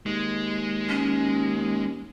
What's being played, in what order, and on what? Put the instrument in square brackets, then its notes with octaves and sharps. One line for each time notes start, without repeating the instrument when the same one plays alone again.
[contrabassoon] D#2 [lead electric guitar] G#3
[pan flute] C#4